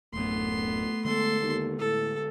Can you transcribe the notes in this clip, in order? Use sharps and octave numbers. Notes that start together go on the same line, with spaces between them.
D1 F#2 A3 B3 C6
D3 G#3 B3 A4 C6
D#2
A2 A4